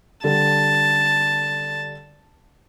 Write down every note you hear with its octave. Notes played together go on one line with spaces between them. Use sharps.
D3 G3 A4 A5